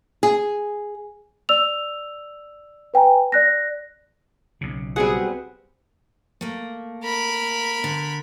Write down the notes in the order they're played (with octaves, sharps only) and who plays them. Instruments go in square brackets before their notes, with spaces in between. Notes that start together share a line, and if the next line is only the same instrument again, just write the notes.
[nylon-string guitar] G#4
[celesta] D5 E6 F7
B4 G5 G#5 A#5
D5 F#6 A#6
[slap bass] B1 C#3
[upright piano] G3 B3 F#4 [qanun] C4 B4 F#5 [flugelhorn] G#4
[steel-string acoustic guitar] A3 A#3
[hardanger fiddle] A#4 B5
[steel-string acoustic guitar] D3